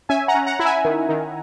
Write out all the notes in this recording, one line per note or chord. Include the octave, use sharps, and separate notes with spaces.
C#4 E5 G#5
F#5 A#5
C#4
F#5 A#5
E4
E5 G#5
D#3
D#3